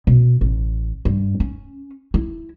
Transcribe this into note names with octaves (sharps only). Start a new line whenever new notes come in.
B2
A1
G2
C#4
E4